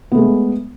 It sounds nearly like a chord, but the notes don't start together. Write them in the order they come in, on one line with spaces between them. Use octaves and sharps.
B3 A3 G#3